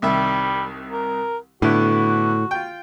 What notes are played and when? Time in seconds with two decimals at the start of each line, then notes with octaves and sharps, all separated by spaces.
0.02 C2 D#3 G3 E5
0.92 A#4
1.62 A2 D3 B3 E4 F#4
2.51 F4 G5